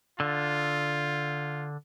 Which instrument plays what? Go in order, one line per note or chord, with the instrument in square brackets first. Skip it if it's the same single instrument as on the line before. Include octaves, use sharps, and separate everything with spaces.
[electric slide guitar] D3 [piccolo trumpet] F4